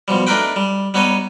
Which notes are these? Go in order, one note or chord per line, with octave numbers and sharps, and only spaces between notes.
B2 F3 G3
A3 D4 D#4 A#4 B4 G5
G3
G3 B3 D#4 C#5 D#5